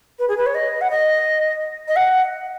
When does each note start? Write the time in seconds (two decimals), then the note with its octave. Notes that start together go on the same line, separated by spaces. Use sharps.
0.19 B4
0.28 G#4
0.37 B4
0.46 C#5
0.55 D#5
0.81 F#5
0.90 D#5
1.88 D#5
1.96 F#5